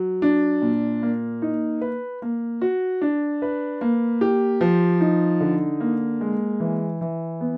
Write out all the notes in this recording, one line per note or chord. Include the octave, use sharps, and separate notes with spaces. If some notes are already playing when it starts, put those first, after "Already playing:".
Already playing: F#3
D4
A#2
A#3
D#4
B4
A#3
F#4
D4
B4
A#3
G4
F3
D#4
D3
A#3
G#3
E3
E3
B3